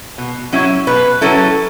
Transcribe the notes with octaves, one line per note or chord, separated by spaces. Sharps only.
B2
F#3 C#4 E4
B2 B4
F#3 C#4 E4 A4